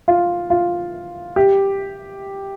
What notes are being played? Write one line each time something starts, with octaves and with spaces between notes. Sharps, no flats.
F4
F4
G4